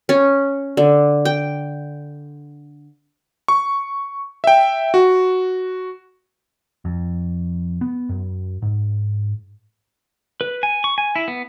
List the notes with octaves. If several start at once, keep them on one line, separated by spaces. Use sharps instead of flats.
C#4
D3
G5
C#6
E5 G5
F#4
F2
B3
F#2
G#2
B4
G#5
C#6
G#5
E4
B3